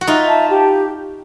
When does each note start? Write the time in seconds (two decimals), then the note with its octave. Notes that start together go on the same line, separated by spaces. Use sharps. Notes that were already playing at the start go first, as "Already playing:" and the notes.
0.01 F#4
0.07 D#4 F4 E5
0.29 A5
0.50 G4